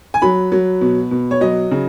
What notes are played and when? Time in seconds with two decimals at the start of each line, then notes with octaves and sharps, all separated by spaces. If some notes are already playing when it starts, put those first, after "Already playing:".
0.14 G#5
0.22 F#3 B5
0.52 F#3
0.81 B2
1.11 B2
1.31 C#5
1.41 F#3 D#5
1.71 C#3